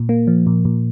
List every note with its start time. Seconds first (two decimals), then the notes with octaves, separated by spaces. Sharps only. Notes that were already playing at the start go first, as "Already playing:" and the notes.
Already playing: A#2
0.09 A#3
0.27 F3
0.47 A#2
0.65 A#2